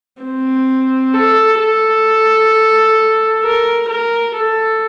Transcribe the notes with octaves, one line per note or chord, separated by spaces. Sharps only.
C4
A4
A4
A#4
A#4
A4